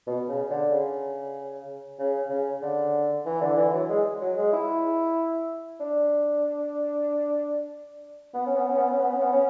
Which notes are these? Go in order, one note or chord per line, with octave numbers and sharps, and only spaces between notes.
B2
C#3
D3
C#3
C#3
C#3
D3
E3
D3
E3
F#3
G#3
F#3
G#3
E4
D4
B3
C#4
B3
C#4
B3
C#4
B3
C#4
B3
C#4